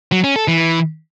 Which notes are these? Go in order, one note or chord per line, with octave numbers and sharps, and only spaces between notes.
F#3
C#4
A4
E3